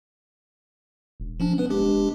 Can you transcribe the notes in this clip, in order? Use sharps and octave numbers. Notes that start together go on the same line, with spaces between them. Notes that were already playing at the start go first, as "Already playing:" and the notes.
E1
F3 C#4 D4
B3 B4
G#3 D4 G4